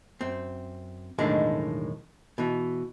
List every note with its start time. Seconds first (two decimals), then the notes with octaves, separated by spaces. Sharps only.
0.21 F#2 C4
1.19 B1 E2 A2 D#3 G#3 D4
2.38 B2 E3